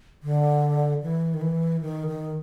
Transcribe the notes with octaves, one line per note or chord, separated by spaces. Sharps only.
D3
E3
D#3
E3
D#3
D#3